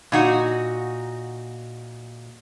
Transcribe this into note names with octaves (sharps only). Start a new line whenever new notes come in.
A#2 D#4 F#4